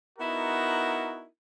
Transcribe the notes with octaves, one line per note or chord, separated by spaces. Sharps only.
B3 D#4 E4 F#4 A#4